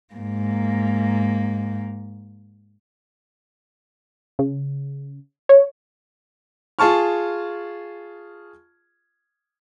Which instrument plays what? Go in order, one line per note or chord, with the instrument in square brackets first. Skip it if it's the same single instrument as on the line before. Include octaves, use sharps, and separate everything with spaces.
[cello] G#2 A#3
[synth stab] C#3
C#5
[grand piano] F4 G#4 A5 C#6 F6